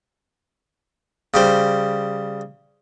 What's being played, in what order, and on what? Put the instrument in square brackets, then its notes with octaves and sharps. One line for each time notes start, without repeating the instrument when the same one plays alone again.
[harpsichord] C#3 G3 C5